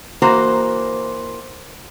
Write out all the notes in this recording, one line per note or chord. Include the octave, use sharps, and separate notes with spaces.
E3 A#3 F#4 C5